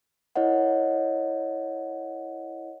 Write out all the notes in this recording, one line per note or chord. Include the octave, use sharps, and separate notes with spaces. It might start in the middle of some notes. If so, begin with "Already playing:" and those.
E4 A#4 C#5 D#5 F#5